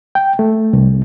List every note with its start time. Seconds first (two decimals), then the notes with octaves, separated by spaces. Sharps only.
0.15 G5
0.39 A3
0.73 C2